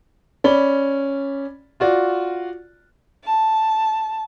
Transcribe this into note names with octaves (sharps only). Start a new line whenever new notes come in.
C#4 D5 B5 G7
F4 F#4 D5
A5